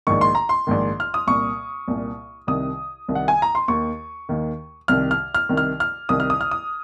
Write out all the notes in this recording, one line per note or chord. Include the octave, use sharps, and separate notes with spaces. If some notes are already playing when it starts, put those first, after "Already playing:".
A#1 G#2 D#3 C#6
C6
A#5
C6
A#1 G#2 D#3
F6
D#6
C2 A#2 C#6
C2 A#2
C2 C3 D#3 D#6
C2 C3 D#3
F#5
G#5
A#5
C6
D#2 D#3 C#6
D#2 D#3
C2 C3 D#3 F6
F6
F6
C2 C3 D#3
F6
F6
C2 C3 D#3 D#6
F6
D#6
F6
D#6